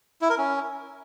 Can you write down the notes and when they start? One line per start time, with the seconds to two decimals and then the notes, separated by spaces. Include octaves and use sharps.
0.22 E4
0.30 A#4
0.38 C#4